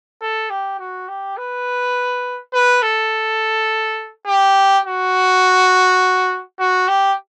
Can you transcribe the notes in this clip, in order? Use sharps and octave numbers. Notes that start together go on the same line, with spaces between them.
A4
G4
F#4
G4
B4
B4
A4
G4
F#4
F#4
G4